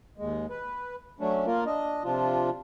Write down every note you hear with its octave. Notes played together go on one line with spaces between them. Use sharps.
D#2 G#3
B4
F#3 A3 C#4 D4
A#3 F4 A#4
D4 D#5
C3 F3 D4 F4